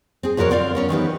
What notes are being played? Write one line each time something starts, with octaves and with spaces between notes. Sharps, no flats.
C4 G#4
F2 F3 F#4 A#4 C#5
D3 C4 F4 D5 F5
B3 C#4 A#4
D#3 E3 B3 G4